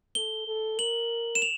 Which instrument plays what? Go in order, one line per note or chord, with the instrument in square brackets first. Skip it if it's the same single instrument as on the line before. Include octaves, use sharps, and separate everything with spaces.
[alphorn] A4 [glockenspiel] G7
[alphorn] A4
[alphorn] A#4 [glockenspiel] F#7
[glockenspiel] E7
F7